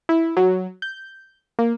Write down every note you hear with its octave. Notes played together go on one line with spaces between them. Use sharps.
E4
F#3
G6
A#3